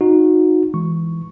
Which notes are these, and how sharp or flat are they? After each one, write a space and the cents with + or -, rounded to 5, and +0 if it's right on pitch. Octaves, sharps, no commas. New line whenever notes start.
D#4 +0 F#4 -25
E3 +5 G#3 +0 C#6 +0